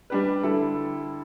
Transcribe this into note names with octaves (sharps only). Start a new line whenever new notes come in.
G3 D4 G4 B4
D3 G3 E4 A4